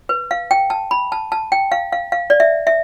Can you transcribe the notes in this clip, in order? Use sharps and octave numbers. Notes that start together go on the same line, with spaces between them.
B4
F5
G5
A5
B5
A5
A5
G5
F5
F5
F5
D5
E5
E5